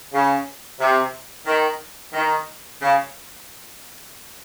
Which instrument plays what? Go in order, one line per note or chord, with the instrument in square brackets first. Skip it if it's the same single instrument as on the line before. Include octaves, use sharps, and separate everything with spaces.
[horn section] C#3
C3
D#3
D#3
C#3